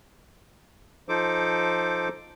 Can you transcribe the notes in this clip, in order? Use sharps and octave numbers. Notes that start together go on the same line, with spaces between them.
F3 D#4 A4 C5 D6